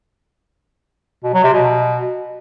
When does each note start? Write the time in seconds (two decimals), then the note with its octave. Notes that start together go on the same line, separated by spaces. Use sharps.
1.24 B2
1.34 F#3
1.44 C3
1.53 B2